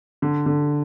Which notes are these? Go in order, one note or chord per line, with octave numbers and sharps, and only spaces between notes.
D3
D3